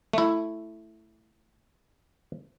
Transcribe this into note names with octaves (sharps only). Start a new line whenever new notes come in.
A3 E4